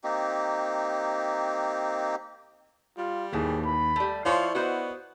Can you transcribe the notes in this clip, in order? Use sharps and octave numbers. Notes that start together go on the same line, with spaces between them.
A#3 C4 D#4 G4
G3 F4
D#2 A2 E3 G#4
B5
G3 A3
F3 E4 F4 C#5 D5 F5 C#6
B3 F#4 C5 D#5